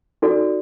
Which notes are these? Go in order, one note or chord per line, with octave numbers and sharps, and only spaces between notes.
D#4 F#4 A4 D5